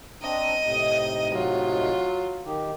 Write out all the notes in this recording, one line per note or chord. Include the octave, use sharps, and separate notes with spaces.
C4 D4 D#5 A#5 D#6
A2 C3 D#4
F#3 F4
D#3 D#4 G4